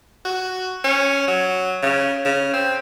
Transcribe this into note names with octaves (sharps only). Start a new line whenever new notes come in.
F#4
C#4
F#3
C#3
C#3
C4